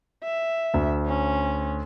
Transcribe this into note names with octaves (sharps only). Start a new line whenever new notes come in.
E5
D2
C#4